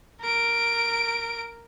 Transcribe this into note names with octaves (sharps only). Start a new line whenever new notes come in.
A#4 D7